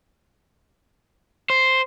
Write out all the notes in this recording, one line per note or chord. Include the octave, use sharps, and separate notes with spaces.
C5